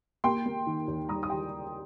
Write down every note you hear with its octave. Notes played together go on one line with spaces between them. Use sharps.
A#3 G5 C6
A#3
D#3
D#2
G3 A#5 D#6
D#6
D#3 G5 C6